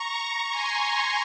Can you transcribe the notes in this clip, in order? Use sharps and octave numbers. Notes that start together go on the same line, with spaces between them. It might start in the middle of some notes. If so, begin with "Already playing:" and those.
Already playing: A#5 C#6
G#5 C6